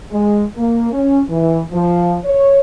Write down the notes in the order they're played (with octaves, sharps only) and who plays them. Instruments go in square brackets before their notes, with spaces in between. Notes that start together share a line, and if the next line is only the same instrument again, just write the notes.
[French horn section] G#3
A#3
C#4
E3
F3
C#5